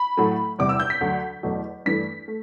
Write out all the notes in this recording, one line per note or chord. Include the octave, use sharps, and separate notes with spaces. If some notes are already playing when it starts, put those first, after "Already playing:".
Already playing: B5
A2 F#3 A3
E2 C3 G3 D6
E6
G6
B6
D2 D3 F#3
E2 B2 F#3 A3
G2 E3 A3 B6
A3